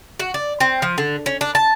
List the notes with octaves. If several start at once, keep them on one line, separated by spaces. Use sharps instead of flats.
F#4
D5
C4
F3
D3
C#4
D4
A5